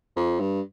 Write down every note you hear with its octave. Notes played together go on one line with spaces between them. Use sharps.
F2
G2